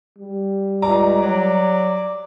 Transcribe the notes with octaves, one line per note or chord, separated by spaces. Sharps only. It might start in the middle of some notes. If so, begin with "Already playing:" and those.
G3
C#2 D5 A#5
F#3 D5